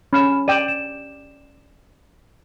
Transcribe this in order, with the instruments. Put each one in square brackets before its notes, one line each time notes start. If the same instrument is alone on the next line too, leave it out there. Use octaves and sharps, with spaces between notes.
[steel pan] C#4 [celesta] B5 F6 E7
[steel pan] D5 G5 [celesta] D#7 E7 F#7
[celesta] E7